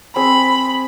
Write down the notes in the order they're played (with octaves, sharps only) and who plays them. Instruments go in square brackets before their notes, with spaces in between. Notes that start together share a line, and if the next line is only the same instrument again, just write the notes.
[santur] C4 G#4 [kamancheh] B5